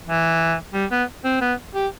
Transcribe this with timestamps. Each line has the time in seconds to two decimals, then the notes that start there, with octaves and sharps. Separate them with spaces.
0.07 E3
0.74 G3
0.91 B3
1.25 C4
1.42 B3
1.75 G4